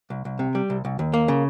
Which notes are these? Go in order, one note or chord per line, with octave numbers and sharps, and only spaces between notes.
C2
C2
C3
G3
C2
C2
D#2
A#3
C#3